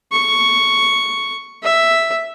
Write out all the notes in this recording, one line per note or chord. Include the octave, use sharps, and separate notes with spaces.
C#6
E5